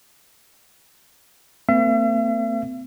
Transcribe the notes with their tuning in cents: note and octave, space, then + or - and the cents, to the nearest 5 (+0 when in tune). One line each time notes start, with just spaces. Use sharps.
A3 +45 C4 -45 E5 +45